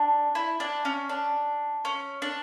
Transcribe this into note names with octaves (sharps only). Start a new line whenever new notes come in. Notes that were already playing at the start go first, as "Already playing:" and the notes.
Already playing: D4
E4
D4
C#4
D4
C#4
D4